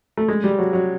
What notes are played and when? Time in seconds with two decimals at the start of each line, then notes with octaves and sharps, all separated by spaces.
0.17 A3
0.28 G#3
0.44 G3
0.58 F#3
0.73 F#3